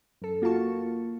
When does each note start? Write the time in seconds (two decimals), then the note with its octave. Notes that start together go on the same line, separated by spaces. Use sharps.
0.22 F#2 A4
0.42 A#3 F4 F#4 A5 C#6